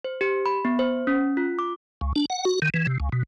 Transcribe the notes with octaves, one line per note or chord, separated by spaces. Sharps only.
C5
G4
B5
B3
C5
C#4
F4
D6
C#2
D4
F#5
F#4
D#3
E3
C3
C#2
B2